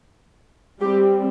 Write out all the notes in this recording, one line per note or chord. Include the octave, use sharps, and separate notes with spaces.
G3 C4 G4